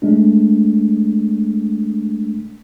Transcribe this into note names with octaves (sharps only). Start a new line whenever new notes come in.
G#3 A3 D4